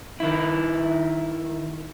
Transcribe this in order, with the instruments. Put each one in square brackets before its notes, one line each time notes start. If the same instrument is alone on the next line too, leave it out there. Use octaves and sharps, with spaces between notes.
[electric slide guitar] D#3 E4